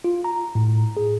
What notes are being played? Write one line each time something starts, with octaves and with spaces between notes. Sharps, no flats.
F4
A#5
A2
G#4